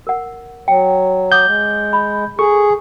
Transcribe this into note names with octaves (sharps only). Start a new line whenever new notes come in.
A#4 F#5
F#3 G5
F#5 D6 D#6 G6
G#3
B5
G#4 A4 C#6